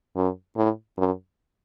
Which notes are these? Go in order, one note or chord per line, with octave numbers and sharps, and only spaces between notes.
F#2
A2
F#2